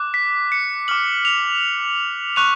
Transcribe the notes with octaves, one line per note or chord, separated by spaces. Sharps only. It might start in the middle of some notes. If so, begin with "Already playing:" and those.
Already playing: D6 F#6
B6
C#7
D6 F6 F#7
F7
C#6 F#6 F7